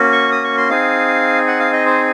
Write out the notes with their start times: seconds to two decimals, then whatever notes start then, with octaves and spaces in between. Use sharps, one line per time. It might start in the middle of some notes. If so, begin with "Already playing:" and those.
Already playing: A#3 C#4 F#4
0.12 C#6
0.32 D#6
0.44 C#6
0.57 C6
0.70 C4 D#4 G#4 F5
1.48 F#5
1.60 F5
1.73 D#5
1.86 C5